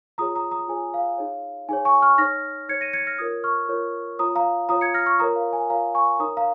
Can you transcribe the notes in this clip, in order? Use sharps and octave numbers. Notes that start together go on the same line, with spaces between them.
F4 G#4 C#5 A#5 D#6
A#5 D#6
A#5 D#6
F4 G#4 C#5 G#5
F5
D#4 G#4 C#5
D#4 G#4 C#5 G#5
G#5 C#6
C#6 F6
D#4 C#5 F6 A#6
D#4 C#5 G#6 C#7
A#6 D#7
G#6 C#7
F6 A#6
F4 A#4 C#5 D#6 G#6
C#6 F6
F4 A#4 C#5
F4 C#5 A#5 D#6
F5 A#5
F4 C#5 A#5 D#6
G#6 C#7
F6 A#6
C#6 F6
F4 A#4 C#5 A#5 D#6
F5
G#5
F4 A#4 C#5 F5 A#5
G#5 C#6
D#4 A#4 C#5 A#5 D#6
F5 A#5